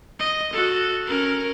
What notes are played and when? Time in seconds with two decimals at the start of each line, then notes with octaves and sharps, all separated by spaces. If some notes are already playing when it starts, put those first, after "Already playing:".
0.20 D#5
0.53 F#4 A4
1.07 C#4 A#4